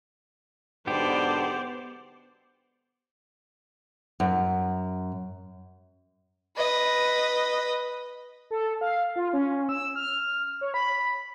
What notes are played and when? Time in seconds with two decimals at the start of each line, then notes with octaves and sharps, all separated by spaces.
0.87 B1 G#2 D3 B3 G4 C5 D5
4.20 F#2
6.56 B4 D#5
8.51 A4
8.81 F5
9.16 F4
9.33 C#4
9.69 E6
9.96 F6
10.61 C#5
10.74 B5